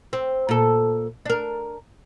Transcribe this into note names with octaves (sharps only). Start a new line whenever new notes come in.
C4
A#2 A4
D4 A#4